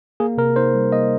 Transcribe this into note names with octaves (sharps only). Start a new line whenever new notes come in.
A#3 G#4
C3 A#4
D#4 C5
G3
A#3 D#5